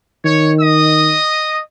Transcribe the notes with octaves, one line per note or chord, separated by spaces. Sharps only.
D#3 C#5
D#5 D#6